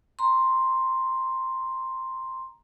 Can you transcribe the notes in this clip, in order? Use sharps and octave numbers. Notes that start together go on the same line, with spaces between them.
A#5 C6